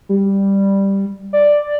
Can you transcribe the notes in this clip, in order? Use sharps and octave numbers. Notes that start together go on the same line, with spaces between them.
G3
D5